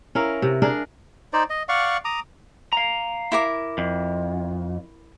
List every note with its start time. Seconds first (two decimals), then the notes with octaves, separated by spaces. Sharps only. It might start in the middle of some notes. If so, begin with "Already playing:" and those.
0.15 C#4 E4 A#4 F5
0.42 C3
0.62 D4 G#4 A#4
1.33 D#4 C5 D5
1.50 D#5
1.69 D5 F5 F#5 C#6
2.05 A#5 D6 D#6
2.73 F5 A#5
3.32 E4 A#4 D6
3.78 F2